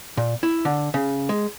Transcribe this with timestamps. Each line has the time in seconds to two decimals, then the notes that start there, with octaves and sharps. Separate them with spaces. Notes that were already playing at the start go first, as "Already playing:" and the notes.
0.17 A#2
0.43 E4
0.65 D3
0.94 C#3
1.29 G#3